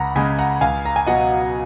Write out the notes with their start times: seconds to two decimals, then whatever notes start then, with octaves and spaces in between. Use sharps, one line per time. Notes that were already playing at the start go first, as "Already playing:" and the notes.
Already playing: C#2 F#5 A#5 B5
0.16 C#3 G#3 G#5 B5
0.39 F#5 A#5
0.61 C#2 F5 G#5
0.85 A#5
0.96 G#5
1.06 B2 F#3 D#5 F#5